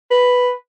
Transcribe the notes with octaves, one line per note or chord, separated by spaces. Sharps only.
B4